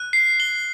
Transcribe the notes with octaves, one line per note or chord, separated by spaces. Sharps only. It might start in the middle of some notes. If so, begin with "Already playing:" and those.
Already playing: F#6
C7
G7